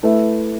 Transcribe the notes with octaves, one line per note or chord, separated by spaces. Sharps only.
A3 E4 B4 E5